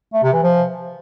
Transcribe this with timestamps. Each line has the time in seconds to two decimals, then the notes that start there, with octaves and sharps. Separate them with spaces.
0.13 A3
0.23 C3
0.33 E3
0.43 F3